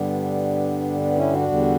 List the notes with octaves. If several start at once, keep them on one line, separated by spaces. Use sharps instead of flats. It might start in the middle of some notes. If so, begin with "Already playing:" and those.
Already playing: G2 D3 G3 B3 D4
B3 D4
C#4 E4
D4 F#4
E2 D3 G3